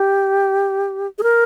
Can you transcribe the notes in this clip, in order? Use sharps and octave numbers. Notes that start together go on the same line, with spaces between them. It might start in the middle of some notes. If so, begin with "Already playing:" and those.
Already playing: G4
G#4
A#4